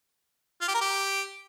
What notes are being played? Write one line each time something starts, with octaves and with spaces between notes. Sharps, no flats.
F4
G4
A#4
G4